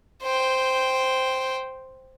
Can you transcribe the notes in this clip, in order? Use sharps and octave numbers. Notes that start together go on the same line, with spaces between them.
C5 G5